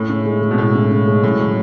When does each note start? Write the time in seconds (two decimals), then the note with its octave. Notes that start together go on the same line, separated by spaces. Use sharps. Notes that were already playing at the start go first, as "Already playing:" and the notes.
Already playing: A2 C#4
0.09 C#3
0.26 G#3
0.41 G#3
0.51 B2
0.58 A2 E4
0.75 C#3
0.91 C#3
1.07 G#3
1.23 A2 F#3
1.40 F#3